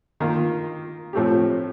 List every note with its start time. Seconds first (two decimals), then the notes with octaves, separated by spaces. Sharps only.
0.20 D#3 A#3 F4
1.13 A2 F3 A3 C4 G4